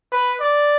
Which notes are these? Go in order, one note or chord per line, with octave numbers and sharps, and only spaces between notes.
B4
D5